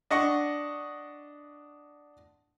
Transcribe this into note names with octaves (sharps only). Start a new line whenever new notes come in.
D4 D#5 F#5 C#6